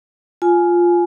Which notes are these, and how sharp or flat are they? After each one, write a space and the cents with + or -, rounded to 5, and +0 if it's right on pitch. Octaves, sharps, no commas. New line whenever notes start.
F4 +0 G#5 +15